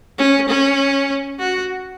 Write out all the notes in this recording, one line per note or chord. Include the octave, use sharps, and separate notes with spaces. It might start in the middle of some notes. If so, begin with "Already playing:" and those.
C#4
C#4
F#4